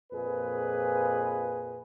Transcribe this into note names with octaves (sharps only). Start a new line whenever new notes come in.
F2 A#2 G#4 B4